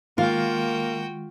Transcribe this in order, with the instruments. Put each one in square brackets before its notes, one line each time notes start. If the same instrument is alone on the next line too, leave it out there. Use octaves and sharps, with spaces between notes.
[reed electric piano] D#3 G#3 [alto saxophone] A#3 [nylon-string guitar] F4 [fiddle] F#4 G5